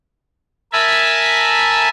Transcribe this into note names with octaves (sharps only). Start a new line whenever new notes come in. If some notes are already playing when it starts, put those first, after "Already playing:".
A#4 E5 G#5 A5 B5